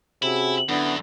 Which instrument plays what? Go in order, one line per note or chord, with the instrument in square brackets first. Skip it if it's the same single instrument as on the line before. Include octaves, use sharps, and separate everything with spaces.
[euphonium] C3 [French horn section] C#4 F#4 G#4 [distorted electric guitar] E4
[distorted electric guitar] F#2 [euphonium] D3 [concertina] B3 [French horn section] D4 E4